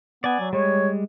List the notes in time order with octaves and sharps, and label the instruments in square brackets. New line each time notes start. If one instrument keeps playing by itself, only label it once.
[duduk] B3 [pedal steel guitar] D5 G#5
[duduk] F#3
[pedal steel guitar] G3 G#3 [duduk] C#5